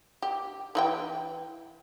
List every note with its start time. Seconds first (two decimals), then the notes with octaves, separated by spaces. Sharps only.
0.22 G4
0.75 E3 E4 G5